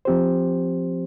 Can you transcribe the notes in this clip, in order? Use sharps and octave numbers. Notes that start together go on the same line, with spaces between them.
F3 C4 G4 C5